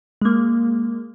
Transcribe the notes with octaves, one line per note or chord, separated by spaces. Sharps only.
G#3 A#3